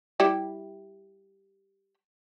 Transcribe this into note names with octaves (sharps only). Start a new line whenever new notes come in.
G3 E4 G4